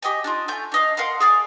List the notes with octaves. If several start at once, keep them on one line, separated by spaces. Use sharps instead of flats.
G4 D#5 G5 G#5
D4 D#4 F4
A3 F4 G#5 G6
D4 D#5 F5
A#4 F5 F#5 C6
G#4 D5 F5 G#5